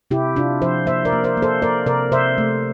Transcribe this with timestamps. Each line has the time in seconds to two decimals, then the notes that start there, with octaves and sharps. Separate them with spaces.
0.11 C3 E4 G4
0.36 C3 D4 F4
0.62 F3 C5 E5
0.86 A#3 C5 E5
1.05 A#4 D5
1.12 A#3
1.24 C5 E5
1.37 A#3
1.42 A4 C5
1.62 A#3 A#4 D5
1.86 C3 A#4 D5
2.12 C3 C5 E5
2.38 A3